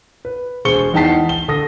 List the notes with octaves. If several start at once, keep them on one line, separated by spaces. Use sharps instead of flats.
B4
E1 G#4 C5 C#6 C#7 G7
E2 D#4 G5 A5 B6 C7
G7
D3 A4 D#6 A#6